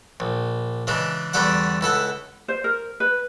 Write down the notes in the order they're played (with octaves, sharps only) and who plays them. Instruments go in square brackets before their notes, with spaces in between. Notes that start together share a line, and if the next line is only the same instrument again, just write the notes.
[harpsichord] A#1
C#3 E3 G#3 D4
E2 D3 G3 A3 D5 F#5
C#2 E4 A4 F#5
[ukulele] C5
A#4
B4